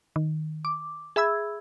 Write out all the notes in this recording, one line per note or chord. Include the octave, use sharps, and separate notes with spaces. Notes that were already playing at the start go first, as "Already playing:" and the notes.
D#3
D6
G#4 E5 B5 E6 G#6